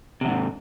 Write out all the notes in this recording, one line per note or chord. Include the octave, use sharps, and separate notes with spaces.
E2 G#2 C3